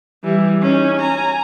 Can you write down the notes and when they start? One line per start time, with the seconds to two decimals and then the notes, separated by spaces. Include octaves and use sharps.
0.24 E3 G3
0.62 C#4 D#4
0.97 G#5 A#5